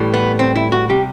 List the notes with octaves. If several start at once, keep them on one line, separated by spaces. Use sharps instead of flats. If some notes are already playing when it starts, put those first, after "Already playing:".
Already playing: A2 E3 G3
B3
C4
E4
F#4
C3 G3 G4